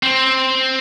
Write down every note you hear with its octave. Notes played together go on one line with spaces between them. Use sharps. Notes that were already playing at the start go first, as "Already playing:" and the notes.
C4